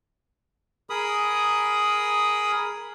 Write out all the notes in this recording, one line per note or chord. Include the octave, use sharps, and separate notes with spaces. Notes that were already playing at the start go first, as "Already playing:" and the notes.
G#4 A#4 B5 D#6